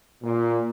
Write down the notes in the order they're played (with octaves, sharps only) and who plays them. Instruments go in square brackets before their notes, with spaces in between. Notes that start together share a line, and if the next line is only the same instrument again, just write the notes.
[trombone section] A#2